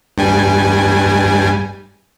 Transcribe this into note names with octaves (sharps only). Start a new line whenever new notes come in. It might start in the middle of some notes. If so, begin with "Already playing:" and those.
G2 G3 G#5